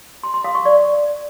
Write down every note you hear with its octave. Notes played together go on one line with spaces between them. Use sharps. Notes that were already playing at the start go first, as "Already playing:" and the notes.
C6
C6
F5
C#6
D5